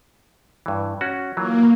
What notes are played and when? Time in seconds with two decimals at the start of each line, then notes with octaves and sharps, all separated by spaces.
0.66 G2 E3
1.01 C#4 F#4
1.37 E3 F#3 A#3 F4